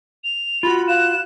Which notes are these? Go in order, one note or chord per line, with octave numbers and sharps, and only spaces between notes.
F7
F4 F#4 B5
F5 F#6 E7